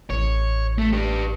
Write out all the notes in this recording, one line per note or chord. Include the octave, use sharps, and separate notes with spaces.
A1 C#5
A3
G4 B4